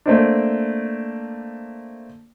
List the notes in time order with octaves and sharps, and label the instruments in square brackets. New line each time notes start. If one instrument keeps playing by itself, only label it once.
[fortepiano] A3 A#3 C4 D4